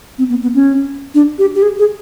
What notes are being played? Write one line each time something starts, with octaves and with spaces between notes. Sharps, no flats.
C4
B3
B3
C#4
D4
G4
G4
G#4
G#4